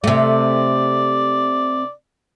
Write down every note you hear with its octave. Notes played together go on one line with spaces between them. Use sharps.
C3 A3 D5